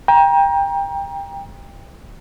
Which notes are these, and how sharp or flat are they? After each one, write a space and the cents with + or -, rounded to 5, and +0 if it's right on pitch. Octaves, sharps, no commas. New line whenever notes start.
G5 +20 A#5 +25